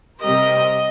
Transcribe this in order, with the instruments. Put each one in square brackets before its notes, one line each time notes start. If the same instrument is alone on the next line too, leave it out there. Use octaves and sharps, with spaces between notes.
[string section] C3 G3 C4 G4 A#4 [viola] D#5